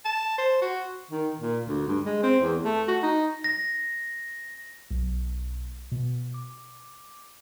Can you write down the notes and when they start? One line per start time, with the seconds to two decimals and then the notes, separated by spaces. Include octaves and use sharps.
0.05 A5
0.38 C5
0.62 F#4
1.11 D#3
1.39 A#2
1.67 D2
1.88 G2
2.06 G#3
2.23 C4
2.42 E2
2.64 A3
2.88 F#4
3.02 D#4
3.44 A#6
4.91 B1
5.92 B2
6.34 D6